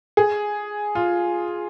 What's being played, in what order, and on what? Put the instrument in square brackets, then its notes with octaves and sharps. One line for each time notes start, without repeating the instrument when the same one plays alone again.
[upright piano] G#4
F4